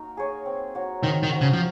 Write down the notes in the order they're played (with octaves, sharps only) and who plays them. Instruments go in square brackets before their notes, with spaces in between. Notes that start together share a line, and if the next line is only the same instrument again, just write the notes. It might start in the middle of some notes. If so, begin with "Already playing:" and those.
Already playing: [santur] A#3 D#4 F#4 A#4
G#4 C#5
C4
F#4 C#5
[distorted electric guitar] D#3 [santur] C4
[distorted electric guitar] D#3
[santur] F#4 C5
[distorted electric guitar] C#3
F3